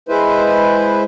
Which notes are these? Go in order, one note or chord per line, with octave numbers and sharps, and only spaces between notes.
G#3 E4 B4 C5